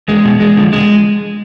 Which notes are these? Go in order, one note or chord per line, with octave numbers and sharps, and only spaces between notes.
E2 G#3
B2
E2 G#3
D3 F3
E2 G#3